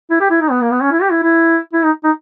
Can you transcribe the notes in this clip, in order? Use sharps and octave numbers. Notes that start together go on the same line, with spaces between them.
E4
G4
E4
D#4
B3
A#3
B3
C#4
E4
G4
E4
E4
E4
D#4
D#4